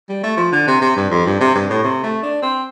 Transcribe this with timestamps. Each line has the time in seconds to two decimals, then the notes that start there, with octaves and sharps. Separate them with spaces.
0.09 G3
0.23 A3
0.37 F3
0.52 D3
0.67 C3
0.81 C3
0.96 G2
1.10 F2
1.25 G2
1.40 C3
1.55 G2
1.70 A2
1.84 C3
2.03 A3
2.23 D4
2.42 C4